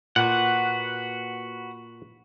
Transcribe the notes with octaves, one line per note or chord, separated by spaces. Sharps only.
A#2 F#4 B4 F#5